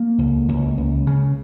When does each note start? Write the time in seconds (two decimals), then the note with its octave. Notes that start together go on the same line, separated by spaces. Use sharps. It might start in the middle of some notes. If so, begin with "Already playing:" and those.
Already playing: A#3
0.18 C#2
0.48 C#2
0.77 C#2
1.07 C#3